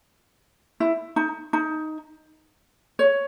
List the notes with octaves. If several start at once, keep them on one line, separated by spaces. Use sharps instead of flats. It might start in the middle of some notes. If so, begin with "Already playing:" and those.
E4
D#4
D#4
C#5